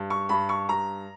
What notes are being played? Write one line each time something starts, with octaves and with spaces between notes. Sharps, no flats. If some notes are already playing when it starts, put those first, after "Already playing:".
Already playing: G2
C#6
G2 B5
C#6
G2 A#5